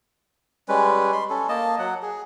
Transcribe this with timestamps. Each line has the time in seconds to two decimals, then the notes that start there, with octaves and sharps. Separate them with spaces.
0.69 G3 G#3 C#4 B4
1.12 B5 C6
1.30 C#4 A4
1.49 A#3 D#5 A5
1.79 F#3 F#5
2.03 G#4